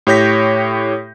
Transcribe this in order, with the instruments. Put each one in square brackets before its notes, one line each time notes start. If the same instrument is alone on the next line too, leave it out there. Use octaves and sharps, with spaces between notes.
[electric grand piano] A2 G4 C#5 G6 A#6 B6